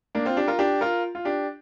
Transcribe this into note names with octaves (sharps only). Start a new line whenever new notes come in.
A#3 D4
C4 F4
D4 G4
F4 A#4
D4 G4
F4 A#4
F4
D4 G4